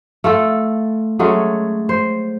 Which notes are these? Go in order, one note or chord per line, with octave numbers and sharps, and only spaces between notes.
A3 F4 A4
F#3 G#3 A3 C#4
C5